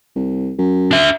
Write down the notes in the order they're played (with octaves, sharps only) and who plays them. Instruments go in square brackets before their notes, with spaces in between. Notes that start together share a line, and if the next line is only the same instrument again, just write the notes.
[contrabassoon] C2
F#2
[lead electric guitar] D4 E5